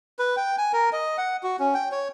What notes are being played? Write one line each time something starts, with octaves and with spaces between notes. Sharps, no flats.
B4
G5
G#5
A#4
D#5
F#5
F#4
C#4
G5
C#5